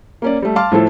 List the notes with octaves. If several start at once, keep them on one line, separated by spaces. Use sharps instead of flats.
A#3 C#4 D5
G3 A3
F5 A5 C6 D6 F6
A2 F3 E4 A4